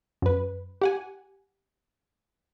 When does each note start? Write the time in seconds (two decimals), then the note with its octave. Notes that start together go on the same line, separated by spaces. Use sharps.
0.22 F#2 B4
0.81 G4 F#5 G#5